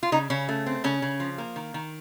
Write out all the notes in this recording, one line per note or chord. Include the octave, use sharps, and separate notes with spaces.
F4
C#3 D#4
C#3 C#4
A3
C4
C#3 C#4
C#3
F3
A#3
D#3
D#3